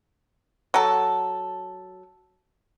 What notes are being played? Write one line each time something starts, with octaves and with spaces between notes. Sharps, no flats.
F#3 A4